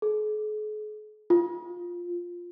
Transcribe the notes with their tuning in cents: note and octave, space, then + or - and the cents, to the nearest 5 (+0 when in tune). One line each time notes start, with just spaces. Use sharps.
G#4 +45
F4 +5